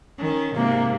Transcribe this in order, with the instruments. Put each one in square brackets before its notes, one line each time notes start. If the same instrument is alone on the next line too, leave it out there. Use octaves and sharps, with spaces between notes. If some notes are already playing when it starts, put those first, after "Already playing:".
[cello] D#3 C#4
[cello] G#2 C3 [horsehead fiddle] A#3